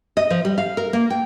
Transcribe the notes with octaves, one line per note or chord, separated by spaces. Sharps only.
D#5
F3
G3
F5
A#4
A#3
G5